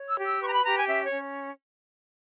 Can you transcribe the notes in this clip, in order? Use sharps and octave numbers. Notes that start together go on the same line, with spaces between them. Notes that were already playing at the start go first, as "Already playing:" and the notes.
Already playing: C#5
E6
G4
E6
B4 C#6
A#5
B5
G4 A#5
G#5
C#4 E5
C#5
C#4